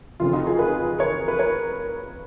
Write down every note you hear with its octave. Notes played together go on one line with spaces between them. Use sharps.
F1 F2 C#3 F4
D#4 F#4
F4 G#4
G#4 B4
A#4 C#5
B4
A#4 C#5